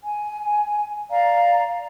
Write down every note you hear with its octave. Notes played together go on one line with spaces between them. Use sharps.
G#5
D5 F5 A#5